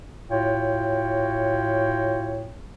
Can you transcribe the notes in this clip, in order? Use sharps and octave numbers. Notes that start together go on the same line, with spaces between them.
A2 F4 F#4 C#5 G5